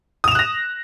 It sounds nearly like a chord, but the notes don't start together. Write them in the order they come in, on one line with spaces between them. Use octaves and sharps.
D#6 F7 E7 F#6 A#6